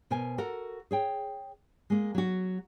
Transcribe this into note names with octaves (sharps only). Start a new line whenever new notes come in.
B2 A#4 C5 G#5
F#4 A4 A#4 F#5
G#4 C#5 G5
G#3 A#3
F#3 F#4